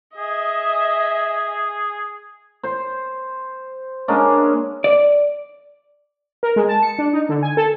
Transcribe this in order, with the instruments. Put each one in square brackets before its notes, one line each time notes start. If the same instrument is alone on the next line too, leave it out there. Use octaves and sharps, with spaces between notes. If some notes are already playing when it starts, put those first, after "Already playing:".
[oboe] G#4 [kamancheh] D#5 E5
[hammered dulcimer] C5 C6
G#3 A#3 C#4 D4
[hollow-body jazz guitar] D5
[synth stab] A#4
G#3
A5
C#7
D4
D#4
D3
G#5
A4